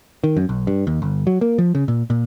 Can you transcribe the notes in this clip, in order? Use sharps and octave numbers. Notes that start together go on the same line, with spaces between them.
D#3
F#2
B1
G2
D#2
G1
F#3
A#3
F3
C#3
A#2
A#2